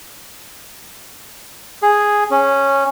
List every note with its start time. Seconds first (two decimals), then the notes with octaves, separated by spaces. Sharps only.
1.83 G#4
2.31 C#4